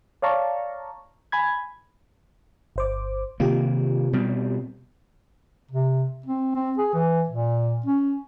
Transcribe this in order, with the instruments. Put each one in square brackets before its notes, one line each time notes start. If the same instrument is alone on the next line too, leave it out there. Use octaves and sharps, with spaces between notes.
[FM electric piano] C#5 D5 F5 A5 A#5 C#6
G#5 B5 G#6
G1 C5 D6
[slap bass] C3 D#3 A#3 [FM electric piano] F4 G4
[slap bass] B2 G3 C4
[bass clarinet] C3
C4
C4
G#4
E3
A#2
C#4